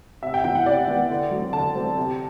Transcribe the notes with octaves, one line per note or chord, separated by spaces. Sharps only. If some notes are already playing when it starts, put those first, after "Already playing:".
C3 E5
G5
E3 B3 G5
F#5
C3 D5
E3 B3
D3
F#3 C4
D3 A5
F#3 C4
C3